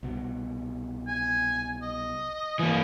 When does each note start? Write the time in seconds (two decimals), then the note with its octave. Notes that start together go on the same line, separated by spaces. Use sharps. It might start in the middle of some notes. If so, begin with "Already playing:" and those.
0.03 C2 B2
1.08 G#5
1.82 D#5
2.59 E3 A#3